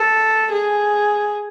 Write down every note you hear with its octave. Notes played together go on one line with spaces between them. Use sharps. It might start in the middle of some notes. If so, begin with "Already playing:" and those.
Already playing: A4
G#4